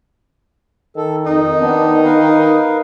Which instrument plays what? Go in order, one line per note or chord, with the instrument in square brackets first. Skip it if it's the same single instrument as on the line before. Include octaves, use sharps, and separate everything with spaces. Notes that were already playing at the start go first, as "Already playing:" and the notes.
[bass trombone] D#3 [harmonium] A4
[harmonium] F2 [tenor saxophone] D#4
[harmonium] B3 D4
A#4 B4 F5